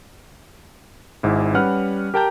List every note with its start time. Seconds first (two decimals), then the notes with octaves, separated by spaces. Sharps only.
1.23 G#1 G#2 E4
1.54 G3 C#4 B4 F#5 F6
2.14 G4 A#4 G5 A5 A#5 G6